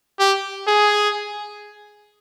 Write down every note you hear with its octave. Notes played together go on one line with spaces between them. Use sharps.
G4
G#4